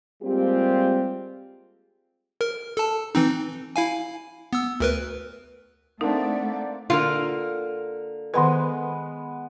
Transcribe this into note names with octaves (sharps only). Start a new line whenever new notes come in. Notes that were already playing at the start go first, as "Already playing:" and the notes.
G3 G#3 A#3 C4 F4 G4
A#4
A4 A5
E3 C4 D#4
E4 F5 G#5
B3 E6
D2 A#4 B4
A3 A#3 C4 D4 D#4 D5 F#5
D3 A#3 F4 A#4
D#3 G#3 B3 B4